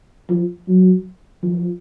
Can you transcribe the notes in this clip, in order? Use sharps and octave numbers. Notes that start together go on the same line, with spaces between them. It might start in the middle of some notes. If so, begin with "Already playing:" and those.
F3
F#3
F3